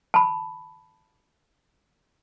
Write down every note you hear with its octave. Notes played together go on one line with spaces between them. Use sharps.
A5 B5